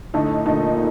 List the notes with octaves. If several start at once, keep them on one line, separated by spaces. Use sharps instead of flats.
A2 D3 A3 D#4
A#2 D3 A3 D#4